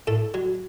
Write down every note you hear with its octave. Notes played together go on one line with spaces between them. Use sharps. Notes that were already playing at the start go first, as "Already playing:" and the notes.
A2 A4
F#3